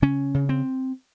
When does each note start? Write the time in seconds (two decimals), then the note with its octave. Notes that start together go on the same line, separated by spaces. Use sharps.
0.02 C#3 C#4
0.34 C#3
0.49 C4